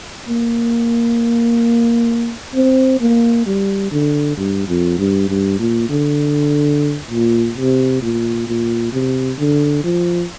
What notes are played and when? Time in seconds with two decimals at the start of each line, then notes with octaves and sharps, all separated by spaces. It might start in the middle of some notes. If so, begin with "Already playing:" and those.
0.29 A#3
2.55 C4
3.01 A#3
3.47 G3
3.92 D3
4.37 G2
4.68 F2
4.99 G2
5.29 G2
5.59 A#2
5.89 D3
7.11 A#2
7.57 C3
8.02 A#2
8.47 A#2
8.93 C3
9.39 D3
9.84 F3